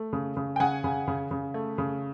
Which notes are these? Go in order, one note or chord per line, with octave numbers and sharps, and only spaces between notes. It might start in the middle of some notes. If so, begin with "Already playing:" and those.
Already playing: A3
C#3
C#3
G5
C#3 F#5 G#5
C#3
C#3
C#3
A3
C#3